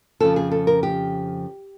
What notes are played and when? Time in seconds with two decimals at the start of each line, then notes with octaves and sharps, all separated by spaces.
0.21 F2 C#3 F3 A4
0.36 G#4
0.52 A4
0.67 A#4
0.83 G4